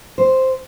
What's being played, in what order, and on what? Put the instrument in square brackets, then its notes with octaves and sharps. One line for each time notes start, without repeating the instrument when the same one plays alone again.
[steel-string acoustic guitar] C5